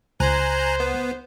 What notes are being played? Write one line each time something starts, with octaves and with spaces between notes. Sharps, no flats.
C#2 C5 G#5 A#5 F#6
B3